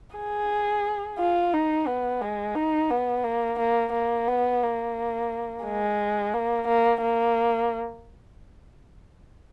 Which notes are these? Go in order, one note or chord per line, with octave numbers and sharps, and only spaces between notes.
G#4
F4
D#4
B3
G#3
D#4
B3
A#3
A#3
A#3
B3
A#3
G#3
A#3
A#3
A#3